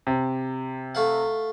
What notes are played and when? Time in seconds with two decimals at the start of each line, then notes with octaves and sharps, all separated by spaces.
0.07 C3
0.95 A3 F5 F#5